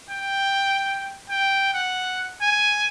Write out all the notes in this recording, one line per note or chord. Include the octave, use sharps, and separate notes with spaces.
G5
G5
F#5
G#5